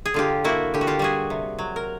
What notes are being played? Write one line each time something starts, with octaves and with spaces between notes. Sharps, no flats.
G#4
D3 F4 G4
A#3 E4 F#4
D3 G4
F#4
F4 G4
G3 F#4 G#4
C3
F#3
A#4